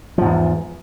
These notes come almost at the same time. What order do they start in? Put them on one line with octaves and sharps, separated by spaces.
F3 G#2 E2